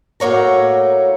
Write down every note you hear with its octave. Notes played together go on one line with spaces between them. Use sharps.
A2 F#3 A#3 C#5 A#5